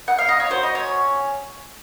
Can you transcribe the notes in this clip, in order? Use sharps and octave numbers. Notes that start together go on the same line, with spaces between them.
F#5
F5
D#5
C#5
F#4 C5
D#5
C#4 C#5